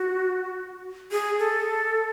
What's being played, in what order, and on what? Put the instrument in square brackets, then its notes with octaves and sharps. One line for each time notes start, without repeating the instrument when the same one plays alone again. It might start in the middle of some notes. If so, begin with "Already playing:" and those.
Already playing: [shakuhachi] F#4
G#4
A4